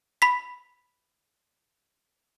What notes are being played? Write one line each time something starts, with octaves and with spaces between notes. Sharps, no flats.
B5 B6